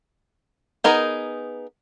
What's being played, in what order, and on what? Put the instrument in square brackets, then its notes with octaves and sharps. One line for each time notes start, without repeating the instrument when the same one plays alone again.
[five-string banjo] B3 D#4 G#4 A#4